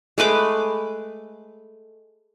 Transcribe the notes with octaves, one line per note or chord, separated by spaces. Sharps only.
G#3 A3 B4 D6